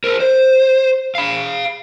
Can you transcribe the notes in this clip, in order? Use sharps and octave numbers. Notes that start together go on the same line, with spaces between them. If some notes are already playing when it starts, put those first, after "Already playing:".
A#4 C5
C5
F5 B5